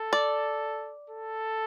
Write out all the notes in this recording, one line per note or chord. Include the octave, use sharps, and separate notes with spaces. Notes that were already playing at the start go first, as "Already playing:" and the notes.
Already playing: A4
D5
A4